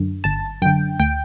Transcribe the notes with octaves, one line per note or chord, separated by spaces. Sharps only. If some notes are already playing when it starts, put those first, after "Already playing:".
Already playing: F#2 D3
G1 A5
F#2 D3 G5
D2 G5